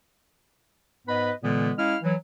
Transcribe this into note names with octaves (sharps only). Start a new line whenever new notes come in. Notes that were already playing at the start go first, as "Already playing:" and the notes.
G#2 B3 B4 D#5 B5
A#2 D3 E3 G#3 B3
G#3 C#4 E4 F5 F6
E3 F#3